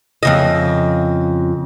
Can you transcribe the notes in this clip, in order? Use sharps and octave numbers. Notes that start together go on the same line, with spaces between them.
F2 C#3 D#5